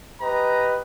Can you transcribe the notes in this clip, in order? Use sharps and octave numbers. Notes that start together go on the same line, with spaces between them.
G4 B4 D#5 A#5